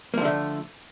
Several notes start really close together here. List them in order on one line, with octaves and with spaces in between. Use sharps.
A#3 F3 D3 A3